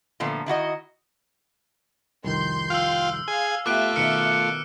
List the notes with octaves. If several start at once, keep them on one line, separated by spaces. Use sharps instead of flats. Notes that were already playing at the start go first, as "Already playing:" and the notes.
A#2 D3 F3 A3 B3
D#3 E4 F#4 D#5
C2 F2 D#3 C6 G6
F4 F5 G5 E6 F6
G#4 F5 G#5
A3 B3 F4 G4 E5 D6 F#6 D7
B2 D#3 A#4 F6 C#7